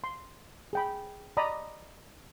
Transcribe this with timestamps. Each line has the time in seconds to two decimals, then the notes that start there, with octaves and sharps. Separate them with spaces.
0.04 C6
0.73 G#4 G5 B5
1.37 D5 D#5 A#5 B5 D#6